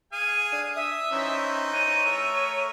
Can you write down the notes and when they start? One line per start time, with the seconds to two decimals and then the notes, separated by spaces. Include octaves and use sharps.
0.13 G#4 F5 G#5 D#7
0.53 D4
0.76 E5 D#6
1.12 E3 C#4 D#4 C5
1.73 C#5 D#7
2.05 A3 A#4 E5